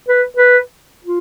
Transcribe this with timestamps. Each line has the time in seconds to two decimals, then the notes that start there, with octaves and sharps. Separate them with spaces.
0.09 B4
0.37 B4
1.05 F4